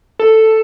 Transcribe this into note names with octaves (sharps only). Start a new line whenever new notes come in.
A4